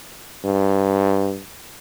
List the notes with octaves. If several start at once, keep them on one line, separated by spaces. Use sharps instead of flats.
G2